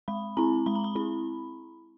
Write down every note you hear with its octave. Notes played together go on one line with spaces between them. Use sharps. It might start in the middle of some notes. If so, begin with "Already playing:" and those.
G#3 B5
C4 E4 A#5
G#3 B5
A#5
B5
C4 E4 B5